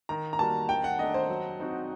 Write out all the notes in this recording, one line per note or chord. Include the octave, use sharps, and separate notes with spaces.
D#3 A#5
A#5
G3 A#3 F#4 A#4 A5
D#3 G5
F#5
A3 D4 D#5
C5
F#3
C4 D#4 F#4